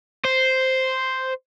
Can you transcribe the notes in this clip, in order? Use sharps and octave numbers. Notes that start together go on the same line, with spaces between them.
C5